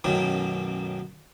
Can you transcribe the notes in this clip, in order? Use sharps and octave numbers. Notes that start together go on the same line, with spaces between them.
A1 F#2 B2 D#3